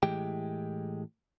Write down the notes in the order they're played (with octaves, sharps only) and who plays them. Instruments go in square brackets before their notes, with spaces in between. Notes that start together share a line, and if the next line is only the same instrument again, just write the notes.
[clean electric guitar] A2 E3 G#3 G4 G5